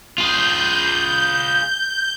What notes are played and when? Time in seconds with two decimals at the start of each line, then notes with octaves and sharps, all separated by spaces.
0.18 F4 G#4 G6